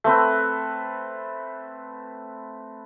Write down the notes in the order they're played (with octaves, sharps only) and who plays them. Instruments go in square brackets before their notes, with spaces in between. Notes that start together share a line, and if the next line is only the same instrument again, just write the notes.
[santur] A3 C4 B4